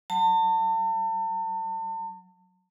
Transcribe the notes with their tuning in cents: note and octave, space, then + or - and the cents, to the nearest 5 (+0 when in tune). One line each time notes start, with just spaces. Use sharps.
F#3 +0 A5 +40